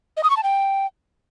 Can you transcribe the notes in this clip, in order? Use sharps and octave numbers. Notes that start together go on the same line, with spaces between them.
D#5
D#6
C#6
A5
G5